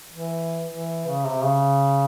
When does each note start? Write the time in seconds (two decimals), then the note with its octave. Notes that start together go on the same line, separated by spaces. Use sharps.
0.12 E3
0.69 E3
1.07 C#3
1.25 C3
1.44 C#3